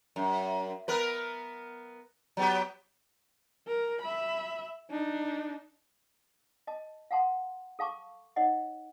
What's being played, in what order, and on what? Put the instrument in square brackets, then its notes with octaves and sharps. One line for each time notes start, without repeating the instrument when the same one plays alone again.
[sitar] F#2
B3 A#4 B4
F#3 B3 G4
[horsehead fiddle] A#4
E5 B5
D4 D#4
[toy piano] D#5 A5
F5 F#5 A5 C6
A4 F5 A5 C#6 D6
D#4 C#5 D#5 F#5